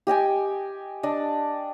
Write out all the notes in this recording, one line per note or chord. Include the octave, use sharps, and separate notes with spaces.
G4 D#5 G5 G#5
D4 D5 D#5